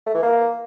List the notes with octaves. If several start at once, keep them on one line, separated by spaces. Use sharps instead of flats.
A3
E3
A#3